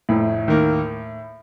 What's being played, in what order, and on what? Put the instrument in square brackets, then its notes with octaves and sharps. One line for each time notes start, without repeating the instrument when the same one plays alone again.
[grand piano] F1 [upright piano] A2
[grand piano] D#2 D#3 A#3